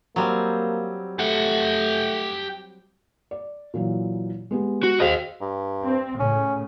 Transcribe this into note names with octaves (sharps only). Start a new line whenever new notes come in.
F#3 G3 A#3 C4
A3 G4 F#5
D5
A#2 E3 F#3
G#3 B3 G4
F#4
F#4 G#4 C5 D#5 F5
G2
C4
A2 C#3 C#4